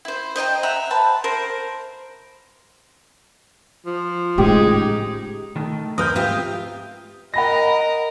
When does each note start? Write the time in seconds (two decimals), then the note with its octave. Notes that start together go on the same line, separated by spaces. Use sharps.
0.05 E4 C5
0.36 C5 D#5 G5 A#5
0.63 E5 F#5 A#5
0.91 B4 C5 A5
1.24 A#4 C5
3.86 F3
4.38 A2 C#3 G#3 D#4 G4
5.56 D#3 A3
5.98 C4 A#4 B4 D#6 F6 G6
6.15 G#2 C4 F4 G4 E5 F5
7.34 A#4 D#5 F#5 B5 A#6